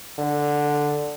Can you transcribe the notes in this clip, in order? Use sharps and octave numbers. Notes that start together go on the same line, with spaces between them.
D3